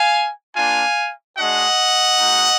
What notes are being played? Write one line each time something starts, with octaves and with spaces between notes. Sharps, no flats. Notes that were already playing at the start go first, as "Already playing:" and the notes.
Already playing: F5 G#5
A#3 D4 F4 F5 G#5
G#3 D4 F#4 D#5 F#5
G#3 D#4 F#4